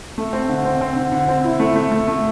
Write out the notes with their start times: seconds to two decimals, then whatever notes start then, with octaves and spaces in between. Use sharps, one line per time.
0.18 A3
0.33 C4
0.49 D3
0.65 C4
0.81 C4
0.96 D3
1.12 D3
1.29 C4
1.44 E4
1.60 A3
1.76 A3
1.92 A3
2.08 A3